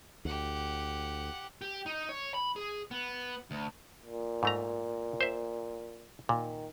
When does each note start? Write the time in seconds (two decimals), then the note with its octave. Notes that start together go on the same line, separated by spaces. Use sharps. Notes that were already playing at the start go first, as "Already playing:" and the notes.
0.25 D2 G4 F#5
1.62 G4
1.86 D#4
2.09 C#5
2.34 B5
2.56 G#4
2.91 B3
3.51 D2
4.03 A#2
4.43 G#2 A3 A#5
5.21 C5 E5
6.29 A#2 D#3